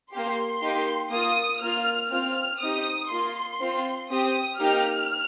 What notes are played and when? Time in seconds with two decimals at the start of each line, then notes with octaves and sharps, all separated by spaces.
0.12 A#3 G4 C6
0.62 A#3 D#4 G4
1.11 A#3 F4 D#6
1.62 A#3 F4 F6
2.11 C4 F4 F6
2.60 C4 D#4 G4 D#6
3.10 A#3 F4 C6
3.60 C4 F4
4.10 C4 G4 D#6
4.60 A#3 D#4 G4 F6